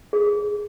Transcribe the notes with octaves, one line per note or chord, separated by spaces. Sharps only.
G#4